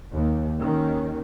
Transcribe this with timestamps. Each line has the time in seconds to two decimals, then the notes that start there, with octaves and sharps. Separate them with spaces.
0.14 D#2
0.59 D#2 D#3 C#4